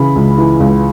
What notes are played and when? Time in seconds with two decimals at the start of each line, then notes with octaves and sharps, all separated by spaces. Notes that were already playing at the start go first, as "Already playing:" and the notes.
Already playing: C#3 E3 B5
0.16 C#2
0.38 E3
0.60 C#2